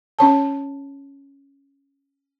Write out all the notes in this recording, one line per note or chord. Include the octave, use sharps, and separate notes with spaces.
C#4 C#5 A5